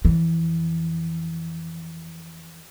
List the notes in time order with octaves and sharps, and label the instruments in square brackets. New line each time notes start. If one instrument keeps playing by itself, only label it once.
[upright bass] F2 E3